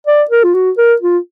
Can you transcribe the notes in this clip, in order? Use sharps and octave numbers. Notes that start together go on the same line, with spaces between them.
D5
A#4
F4
F#4
A#4
F4